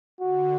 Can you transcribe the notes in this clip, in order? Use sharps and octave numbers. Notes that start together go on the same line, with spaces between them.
D3 F#4